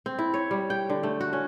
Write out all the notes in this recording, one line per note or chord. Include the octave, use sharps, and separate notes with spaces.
C4
E4
C#5
G3
G5
D3
A3
F#4
C#4